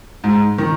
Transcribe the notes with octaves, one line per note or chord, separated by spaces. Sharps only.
G#2
D#3